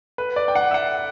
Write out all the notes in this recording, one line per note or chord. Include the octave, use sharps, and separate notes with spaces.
B4
D5
G5
F#5
E5
F#5